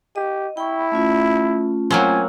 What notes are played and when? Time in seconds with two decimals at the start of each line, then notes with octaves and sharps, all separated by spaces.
0.16 G4 D#5
0.57 E4 G5 B5 C#6
0.92 A3 C#4 F4
1.90 F#3 A#3 C4 G#5